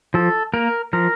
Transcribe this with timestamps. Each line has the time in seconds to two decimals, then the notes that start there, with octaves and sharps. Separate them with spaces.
0.14 F3 A4
0.54 A#3 A#4
0.93 F3 A#4